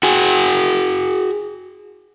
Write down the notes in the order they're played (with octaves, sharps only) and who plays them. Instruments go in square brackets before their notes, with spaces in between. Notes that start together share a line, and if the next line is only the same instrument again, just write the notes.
[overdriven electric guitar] F#4 G#4